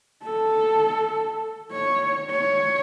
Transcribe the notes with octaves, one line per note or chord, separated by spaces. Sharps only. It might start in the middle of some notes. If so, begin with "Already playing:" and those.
A4
C#5
C#5